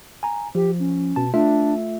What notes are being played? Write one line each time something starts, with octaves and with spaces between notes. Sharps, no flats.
G#5 A#5
F3 G4
C#4
B2 A5
A3 D4 F4 E5